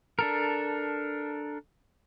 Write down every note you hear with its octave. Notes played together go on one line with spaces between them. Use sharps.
D4 A4 A#4